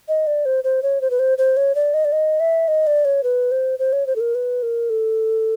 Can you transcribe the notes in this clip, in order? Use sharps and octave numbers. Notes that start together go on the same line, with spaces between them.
D#5
D5
C5
C5
C#5
C5
B4
C5
C5
C#5
D5
D#5
D5
D#5
E5
D#5
D5
C#5
B4
C5
C5
C#5
C5
A4
A#4
B4
A#4
A4